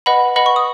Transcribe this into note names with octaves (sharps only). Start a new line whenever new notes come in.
B4 D#5 F#5 B5
B4 D#5 F#5 B5
C#6
D#6